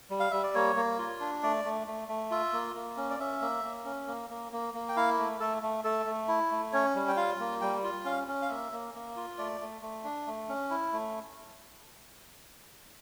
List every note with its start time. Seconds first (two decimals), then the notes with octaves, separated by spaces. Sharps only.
0.10 G3
0.20 F5
0.31 G3 E5
0.43 D5
0.55 A#3 C#5
0.76 A#3
0.99 F4
1.20 D4
1.43 A3 D5
1.65 A3
1.87 A3
2.08 A3
2.31 F4 E5
2.53 A#3
2.75 A#3
2.97 C#4
3.10 D5
3.20 C#4 E5
3.42 A#3
3.64 A#3
3.85 C#4
4.08 A#3
4.30 A#3
4.52 A#3
4.74 A#3
4.89 G5
4.96 E4 F5
5.19 A3
5.40 A3 A4
5.63 A3
5.84 A3 A4
6.06 A3
6.28 E4
6.51 A3
6.73 C#4 C#5
6.95 G3
7.08 G5
7.16 F4 F5
7.40 A#3
7.61 G3 G5
7.84 F4
8.05 C#4 F5
8.28 C#4
8.42 F5
8.49 A#3 E5
8.72 A#3
8.94 A#3
9.16 F4
9.38 A3 D5
9.61 A3
9.82 A3
10.04 D4
10.27 A3
10.49 C#4
10.70 E4
10.92 A3